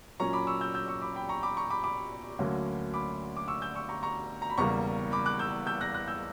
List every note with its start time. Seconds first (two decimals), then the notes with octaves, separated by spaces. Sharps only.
0.20 A#2 F#3 C#4 A#5 C#6
0.33 B5 D6
0.47 C#6 E6
0.61 E6 G6
0.74 E6 G6
0.88 C#6 E6
1.02 B5 D6
1.16 G5 B5
1.29 A#5 C#6
1.43 B5 D6
1.57 A#5 C#6
1.70 B5 D6
1.84 B5 D6
2.39 D2 D3 F#3 A#3 C#4
2.94 B5 D6
3.37 D6
3.48 C#6 E6
3.62 E6 G6
3.75 C#6 E6
3.89 A#5 C#6
4.03 A#5 C#6
4.42 A#5
4.50 B5
4.58 E1 E2 C#3 G3 A#3 A#5 C#6
5.12 B5 D6
5.26 D6 F#6
5.39 E6 G6
5.67 E6 G6
5.81 F#6 A#6
5.94 F#6 A#6
6.08 E6 G6